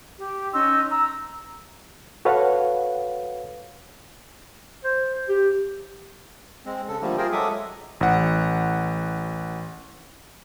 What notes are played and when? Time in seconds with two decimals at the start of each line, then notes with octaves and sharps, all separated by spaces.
0.19 G4
0.53 C#4 D#4 C6 E6
0.90 A#5 E6
2.25 F#4 A4 B4 C#5 F5 F#5
4.84 C5
5.29 G4
6.66 G#3 C4
6.88 C#3 A4
7.02 D3 F3 G3 A3 A#3
7.18 F4 G#4 A#4 C5 G5
7.32 F#3 G#3 A4 E5 D6 D#6
8.01 A1 F#5